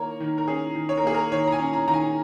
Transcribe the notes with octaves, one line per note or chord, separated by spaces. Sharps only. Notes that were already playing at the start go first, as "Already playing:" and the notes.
Already playing: D#3 A#3 A#4 C#5
D#3
A#4
C#4 G#4
D#3
C#5
A#4
A#3 G#4
A#4
D#3 C#5
A#5
G#5
C#4
A#5
D#3 A#5
G#5